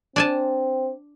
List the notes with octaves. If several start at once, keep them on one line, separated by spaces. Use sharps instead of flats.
C4 D4 G#5 A5